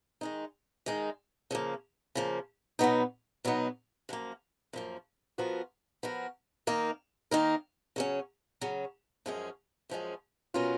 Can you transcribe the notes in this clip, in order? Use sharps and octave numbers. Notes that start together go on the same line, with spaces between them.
D#3 G#3 D#4
D#3 G#3 D#4
C#3 F3 A#3
C#3 F3 A#3
B2 F#3 B3 D#4
B2 F#3 B3 D#4
F#2 F3 A#3
F#2 F3 A#3
F3 B3 F#4 A#4
F3 B3 F#4 A#4
D#3 A#3 D#4 A#4
D#3 A#3 D#4 A#4
C#3 F#3 C#4
C#3 F#3 C#4
F#2 F3 G#3 C#4 G#4
F#2 F3 G#3 C#4 G#4
B2 F#3 C#4 F4 A#4